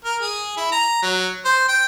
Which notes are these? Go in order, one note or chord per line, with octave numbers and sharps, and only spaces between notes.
A#4
G#4
E4
A#5
F#3
C5
G5